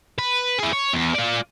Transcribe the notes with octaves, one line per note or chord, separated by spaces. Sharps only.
B4
E4 G#4
C#5
E2
F4 D5